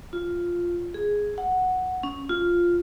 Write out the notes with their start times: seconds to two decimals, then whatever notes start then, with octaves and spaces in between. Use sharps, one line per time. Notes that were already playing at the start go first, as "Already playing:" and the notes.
0.13 F4
0.94 G#4
1.38 F#5
2.03 C#4
2.29 F4